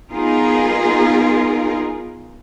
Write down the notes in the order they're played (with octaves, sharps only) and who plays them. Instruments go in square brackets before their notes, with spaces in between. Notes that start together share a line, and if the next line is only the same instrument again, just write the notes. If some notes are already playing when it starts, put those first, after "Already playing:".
[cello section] B3 D#4 F4 G#4 A#4